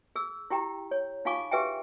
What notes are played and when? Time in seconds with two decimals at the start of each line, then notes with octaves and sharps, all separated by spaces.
0.16 G#4 E6
0.50 E4 G4 G5 A#5
0.91 C#5
1.25 D#4 F4 F5 G#5 C#6 D6
1.51 G4 G#4 B4 E5 G5 G#5